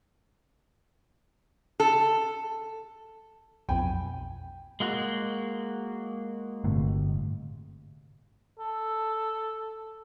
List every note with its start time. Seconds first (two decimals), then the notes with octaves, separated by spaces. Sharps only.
1.80 A4
3.69 B1 F2 G5 G#5 B5
4.80 G#3 A#3 F#4
6.64 G1 A2 C3
8.59 A4